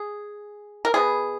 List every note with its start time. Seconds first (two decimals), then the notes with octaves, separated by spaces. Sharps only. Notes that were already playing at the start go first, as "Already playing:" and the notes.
Already playing: G#4
0.85 A#4
0.94 B2 F#3 B3 G#4